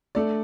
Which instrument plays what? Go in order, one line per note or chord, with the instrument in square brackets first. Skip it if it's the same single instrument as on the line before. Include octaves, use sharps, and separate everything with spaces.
[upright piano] A3 D4 A4 D5